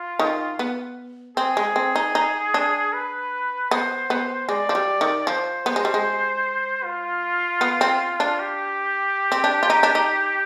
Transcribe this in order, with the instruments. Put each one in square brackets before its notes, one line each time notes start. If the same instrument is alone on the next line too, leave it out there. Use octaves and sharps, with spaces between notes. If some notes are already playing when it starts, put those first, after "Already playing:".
Already playing: [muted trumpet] F4
[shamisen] D#3
B3
[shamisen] C4 [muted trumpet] G#4
[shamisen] G#3
C4
D#4
D#4
D4
[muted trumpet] B4
[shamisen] B3 [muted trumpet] C5
[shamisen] B3
[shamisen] G#3 [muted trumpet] D5
[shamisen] F3
G3
D#3
[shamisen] F3 [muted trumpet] C5
[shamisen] B3
G#3
G3
G#3
[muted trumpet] F4
[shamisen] B3
C4
D4
[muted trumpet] G4
[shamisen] C4
D4
F4
D#4
D4
D#4